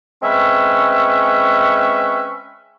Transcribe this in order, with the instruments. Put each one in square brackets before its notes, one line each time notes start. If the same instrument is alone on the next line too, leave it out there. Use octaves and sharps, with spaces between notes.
[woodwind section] G#3 C4 C#4 B4 E5